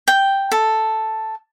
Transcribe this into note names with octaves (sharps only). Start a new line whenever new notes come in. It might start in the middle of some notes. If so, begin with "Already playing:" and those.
G5
A4